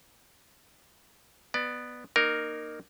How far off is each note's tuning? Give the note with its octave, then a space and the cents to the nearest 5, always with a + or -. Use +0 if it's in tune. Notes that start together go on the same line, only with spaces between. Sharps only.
B3 +0 D5 +20
A#3 +0 D#4 -30 A#4 +0